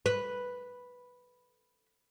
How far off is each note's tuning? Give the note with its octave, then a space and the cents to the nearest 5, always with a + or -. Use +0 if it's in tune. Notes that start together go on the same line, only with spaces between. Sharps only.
B4 +0